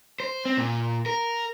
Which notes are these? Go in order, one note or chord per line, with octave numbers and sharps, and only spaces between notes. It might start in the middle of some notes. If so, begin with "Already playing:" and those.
C5
C4
A#2
A#4